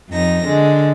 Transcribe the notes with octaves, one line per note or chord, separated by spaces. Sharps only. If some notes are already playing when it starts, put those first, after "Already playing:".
F2 D#4 A#6
D3 G#3